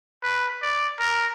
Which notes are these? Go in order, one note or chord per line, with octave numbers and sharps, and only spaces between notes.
B4
D5
A#4